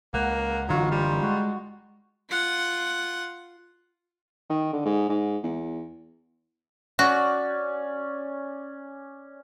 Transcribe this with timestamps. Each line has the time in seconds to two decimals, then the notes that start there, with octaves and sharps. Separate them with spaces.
0.14 C#2 A#3 F#5
0.69 F#1 D3 E3 F#3 D#4 F4 C#6
0.91 G3
1.23 G#3 F#4
2.29 F4 F#5
4.50 D#3
4.73 D3
4.85 G#2
5.09 G#2
5.43 E2
6.99 C#4 F#4 D5